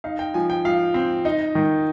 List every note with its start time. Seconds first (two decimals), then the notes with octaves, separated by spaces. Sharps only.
0.04 D#4 F5
0.19 G5
0.34 F3 G#5
0.50 G5
0.65 F3 F5
0.94 C4
1.25 D#4 D#5
1.55 D#3